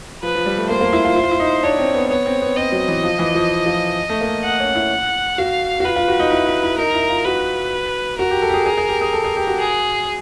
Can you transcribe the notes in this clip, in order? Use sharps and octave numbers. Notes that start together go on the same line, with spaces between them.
F3 B4
F3
G3
A3
A#3 C5
A#3
E4
F4
E4
F4
E4
D#4
D4 C#5
C4
B3
B3 C#5
C4
B3
C4 D#5
F#3
E3
F3
E3
F3
F3
A3
A#3
F#5
C#4
E4
F#4 F5
F#4
F4 B4
F4
F#4
D#4
E4
E4
E4
D#4 A#4
E4
F4
F#4 B4
F#4 A#4
G4
A4
G4
G#4
G#4
G#4
G4
G#4
A4
G#4
G4
F#4
G#4